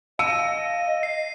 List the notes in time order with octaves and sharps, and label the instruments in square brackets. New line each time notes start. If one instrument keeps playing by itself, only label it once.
[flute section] D#5 [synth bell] F5 [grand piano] E6 [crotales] D#7
[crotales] C7